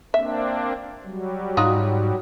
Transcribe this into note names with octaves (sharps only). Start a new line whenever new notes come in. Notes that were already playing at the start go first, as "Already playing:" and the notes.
A#3 C4 D4 E5
F#3 G3
G#2 D#4 F4 F#4